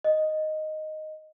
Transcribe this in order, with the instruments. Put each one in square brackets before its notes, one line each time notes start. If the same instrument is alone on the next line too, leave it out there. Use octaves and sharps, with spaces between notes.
[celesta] D#5